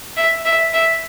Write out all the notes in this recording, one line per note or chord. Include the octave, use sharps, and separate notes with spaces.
E5
E5
E5